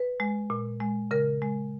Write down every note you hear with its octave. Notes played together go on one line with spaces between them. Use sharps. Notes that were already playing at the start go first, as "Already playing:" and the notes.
Already playing: B4
G#3
A#2
G#3
C#3 A#4
G#3